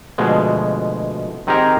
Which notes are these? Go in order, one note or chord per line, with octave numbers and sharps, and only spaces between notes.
D2 B2 F3 G#3
D#3 C4 D#4 G4 G#4 A#4